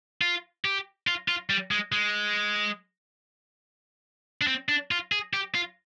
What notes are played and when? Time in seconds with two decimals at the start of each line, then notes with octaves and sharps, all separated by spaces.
0.21 F4
0.65 G4
1.07 F4
1.28 F4
1.50 G3
1.71 G#3
1.92 G#3
4.41 D4
4.47 C4
4.69 D4
4.91 F4
5.12 G#4
5.33 G4
5.54 F4